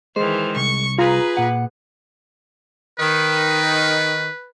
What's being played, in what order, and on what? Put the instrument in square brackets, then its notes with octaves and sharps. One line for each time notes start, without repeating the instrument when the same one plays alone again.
[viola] D#3 E3 [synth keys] G#3 [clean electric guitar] C5
[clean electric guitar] C2 [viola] C#6
[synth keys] F4 A#5 [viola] G#4 B4
[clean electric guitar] A#2 F#5
[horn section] D#3 [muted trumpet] B4